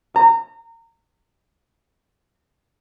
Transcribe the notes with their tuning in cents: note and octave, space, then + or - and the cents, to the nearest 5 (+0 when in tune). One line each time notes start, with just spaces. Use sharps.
A#5 -30